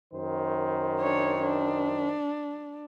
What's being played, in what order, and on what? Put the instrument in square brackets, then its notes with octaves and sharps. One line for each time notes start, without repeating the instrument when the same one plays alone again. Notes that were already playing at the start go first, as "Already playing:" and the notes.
[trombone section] F#2 D#3 C5
[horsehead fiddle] D4 C#5
D4